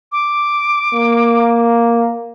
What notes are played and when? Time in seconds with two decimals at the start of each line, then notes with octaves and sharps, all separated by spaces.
0.12 D6
0.94 A#3